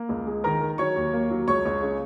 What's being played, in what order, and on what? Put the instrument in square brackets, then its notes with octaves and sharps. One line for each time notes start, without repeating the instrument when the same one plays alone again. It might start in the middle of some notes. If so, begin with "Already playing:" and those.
Already playing: [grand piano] A#3
C#2
G#3
D#3 A#4 A#5
D#3
F#3 C#5 C#6
D#2
A#3
F#3
C#2 C#5 C#6
C#2
C#3